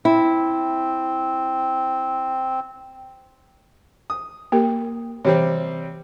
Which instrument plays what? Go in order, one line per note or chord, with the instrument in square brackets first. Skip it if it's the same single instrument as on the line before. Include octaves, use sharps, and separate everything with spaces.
[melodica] C4 [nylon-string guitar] E4
[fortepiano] D#6
[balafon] A#3 G4 A#4
[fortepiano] C3 G3 C4 [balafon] E3 C#5